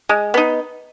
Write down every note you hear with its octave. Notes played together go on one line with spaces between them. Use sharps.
G#3
B3 D#4